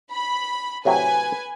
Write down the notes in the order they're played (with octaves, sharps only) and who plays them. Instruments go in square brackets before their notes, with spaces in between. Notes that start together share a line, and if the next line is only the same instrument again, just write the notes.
[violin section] B5
[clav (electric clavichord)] A2 C3 F#3 [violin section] B4 G#5